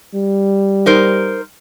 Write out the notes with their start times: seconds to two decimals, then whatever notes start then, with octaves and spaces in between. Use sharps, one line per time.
0.15 G3
0.86 D#4 A#4 C5